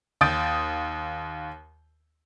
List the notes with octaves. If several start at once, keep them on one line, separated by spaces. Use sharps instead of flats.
D#2 D#6 G6 A6 D7